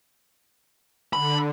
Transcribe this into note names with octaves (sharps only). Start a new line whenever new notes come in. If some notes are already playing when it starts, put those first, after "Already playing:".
D3 B5